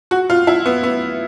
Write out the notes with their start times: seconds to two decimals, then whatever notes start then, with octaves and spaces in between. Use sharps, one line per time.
0.11 F#4
0.30 F4
0.47 E4
0.66 B3
0.83 B3